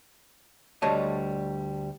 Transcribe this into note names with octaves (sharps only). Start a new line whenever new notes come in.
D2 G3 A3 C#5 D#5 A5